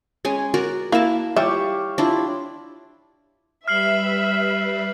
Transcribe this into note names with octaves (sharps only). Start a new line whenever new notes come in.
G#3 C#4 G#5
F#4 A#4 D5
A#3 E4 A#4 A5
G3 G4 C#5 E5 F5
D4 E4 F4
G3 B4 E5 F6 C7 F#7